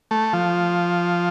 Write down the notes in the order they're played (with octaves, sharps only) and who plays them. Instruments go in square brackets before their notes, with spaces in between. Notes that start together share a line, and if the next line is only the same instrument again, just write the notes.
[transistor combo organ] A3
F3